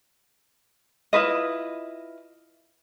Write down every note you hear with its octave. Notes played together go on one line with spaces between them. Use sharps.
E4 F4 B4 D#5